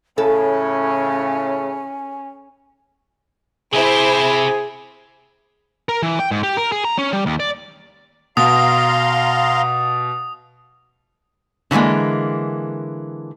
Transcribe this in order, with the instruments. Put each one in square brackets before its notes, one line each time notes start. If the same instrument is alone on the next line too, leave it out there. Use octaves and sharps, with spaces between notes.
[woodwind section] A2 C#3 [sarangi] C#4 [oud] A4 [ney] G#5
[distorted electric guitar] C3 G4 [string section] E4 C5 [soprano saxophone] G#4
[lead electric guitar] A#4
E3
G5
G#2
G4
A#4
G#4
A#5
C#4
G3
D#2
D5
[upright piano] B2 [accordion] F5 A#5 C6 [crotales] D#6
[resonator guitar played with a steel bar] D3 E3 F3 G#3 A#3